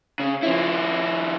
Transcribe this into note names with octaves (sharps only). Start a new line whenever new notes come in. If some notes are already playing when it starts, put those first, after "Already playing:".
C#3
F3 E4